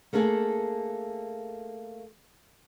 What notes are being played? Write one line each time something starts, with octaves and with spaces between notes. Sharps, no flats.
A3 A#3 D4 G#4 A4